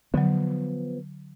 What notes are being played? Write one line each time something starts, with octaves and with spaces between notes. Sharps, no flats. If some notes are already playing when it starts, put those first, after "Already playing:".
D3 F3 F#3 B3